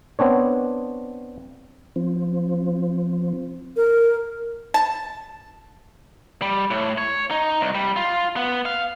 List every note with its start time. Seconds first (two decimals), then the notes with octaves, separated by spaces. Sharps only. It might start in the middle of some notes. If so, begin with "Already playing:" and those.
0.19 B3 C4 D4 C#5
1.96 F3 C4
3.76 A#4
4.74 A5
6.42 G3
6.71 A2
6.98 C#5
7.31 D#4
7.61 C2
7.75 G3
7.96 F4
8.36 B3
8.66 F5